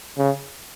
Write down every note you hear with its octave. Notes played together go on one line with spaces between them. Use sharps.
C#3